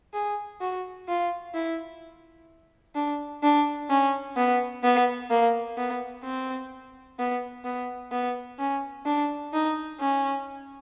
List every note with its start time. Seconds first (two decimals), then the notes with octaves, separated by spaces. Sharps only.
0.14 G#4
0.61 F#4
1.08 F4
1.54 E4
2.95 D4
3.43 D4
3.90 C#4
4.37 B3
4.84 B3
5.30 A#3
5.77 B3
6.24 C4
7.19 B3
7.65 B3
8.12 B3
8.59 C#4
9.05 D4
9.53 D#4
9.99 C#4